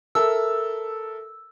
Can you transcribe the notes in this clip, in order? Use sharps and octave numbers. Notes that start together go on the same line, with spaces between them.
A4 A#4 E5 E6